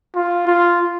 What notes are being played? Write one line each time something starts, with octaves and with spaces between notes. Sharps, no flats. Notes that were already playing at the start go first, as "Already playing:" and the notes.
F4
F4